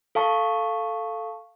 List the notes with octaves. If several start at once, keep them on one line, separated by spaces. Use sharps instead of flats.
A4 F5 A5 C#6